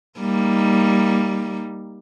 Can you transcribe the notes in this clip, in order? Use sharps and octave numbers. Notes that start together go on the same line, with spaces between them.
G3 A#3 D#4